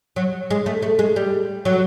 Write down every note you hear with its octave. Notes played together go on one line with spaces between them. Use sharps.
F#3
G#3
A3
A3
G#3
G3
F#3